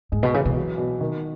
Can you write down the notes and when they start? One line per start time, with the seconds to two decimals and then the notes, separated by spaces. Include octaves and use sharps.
0.12 G#2 G#3
0.23 B2
0.33 C#3 E3
0.45 B2
0.55 F#3
0.78 B2
1.01 D#3